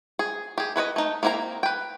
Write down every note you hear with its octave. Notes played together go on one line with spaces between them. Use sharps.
G#4
G4 G#4
E4 B4 C#5 D#5
A3 D#4
A#3 C4 E4 F#4 A#5
B4 G5